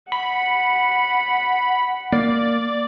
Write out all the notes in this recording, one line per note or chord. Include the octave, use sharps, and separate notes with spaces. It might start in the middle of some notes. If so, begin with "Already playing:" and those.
F#5 B5
A#3 D5